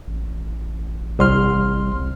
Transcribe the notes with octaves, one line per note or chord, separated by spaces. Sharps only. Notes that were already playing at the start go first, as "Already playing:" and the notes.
A1
C2 C6 F6